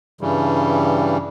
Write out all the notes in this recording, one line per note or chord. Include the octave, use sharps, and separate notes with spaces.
G2 C#3 E3 G3